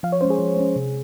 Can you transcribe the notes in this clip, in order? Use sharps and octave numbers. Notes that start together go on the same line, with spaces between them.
F3 F5
C#5
G#3 C#4 C5
G#4
F3
G#3 C#4
C3